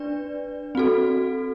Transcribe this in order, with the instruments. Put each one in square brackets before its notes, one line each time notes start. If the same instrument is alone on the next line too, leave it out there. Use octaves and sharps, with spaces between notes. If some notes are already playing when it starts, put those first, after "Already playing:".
Already playing: [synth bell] D4 B4 D5
C4 F#4 A4